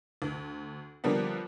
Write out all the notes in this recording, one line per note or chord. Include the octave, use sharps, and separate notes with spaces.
D2
D3 F3 G3 A#3 B3